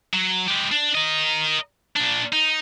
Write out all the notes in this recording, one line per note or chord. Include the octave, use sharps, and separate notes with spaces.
F#3
G#3 G4
D4
A#4 D#5
A#2 D4
D#4